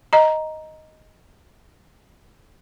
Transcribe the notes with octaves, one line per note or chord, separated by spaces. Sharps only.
D#5 A#5